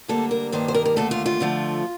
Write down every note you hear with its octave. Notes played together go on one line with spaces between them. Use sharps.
D2 D3 G3 A#3 A4
A#4
G2 D#3 G3 A#3 C5
C5
A#4
A#4
D#2 D3 A3 A4
F4
F4
F2 D3 F3 A3